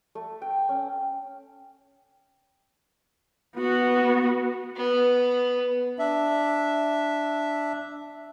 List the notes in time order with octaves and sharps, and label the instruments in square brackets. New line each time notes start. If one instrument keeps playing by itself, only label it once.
[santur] A3
G5
C#4
[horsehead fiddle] B3 F#4
[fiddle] B3
[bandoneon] D4 E5